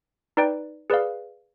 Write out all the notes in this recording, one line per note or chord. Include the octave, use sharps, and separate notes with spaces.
D#4 B4 D5 G5
G#4 B4 D5 F5